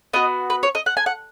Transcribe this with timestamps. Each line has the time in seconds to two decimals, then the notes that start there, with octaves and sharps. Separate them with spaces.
0.13 B3 F#4 D#5
0.50 B4
0.63 C#5
0.75 D#5
0.86 F#5
0.97 G#5
1.06 F#5